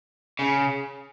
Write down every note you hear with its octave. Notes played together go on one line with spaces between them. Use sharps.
C#3